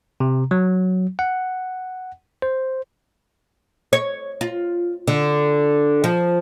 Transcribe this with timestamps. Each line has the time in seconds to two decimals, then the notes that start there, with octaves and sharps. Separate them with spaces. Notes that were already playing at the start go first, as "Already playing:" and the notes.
0.20 C3
0.51 F#3
1.19 F#5
2.42 C5
3.93 C#5
4.41 F4
5.08 D3
6.04 F3